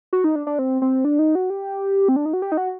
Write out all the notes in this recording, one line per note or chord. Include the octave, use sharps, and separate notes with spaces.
F#4
D#4
D4
D4
C4
C4
D4
D#4
F#4
G4
C4
D4
D#4
F#4
G4
D#4
F#4